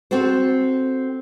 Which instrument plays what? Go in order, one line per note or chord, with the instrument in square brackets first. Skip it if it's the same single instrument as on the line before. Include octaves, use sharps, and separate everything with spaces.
[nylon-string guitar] C4 F#4 A4 C5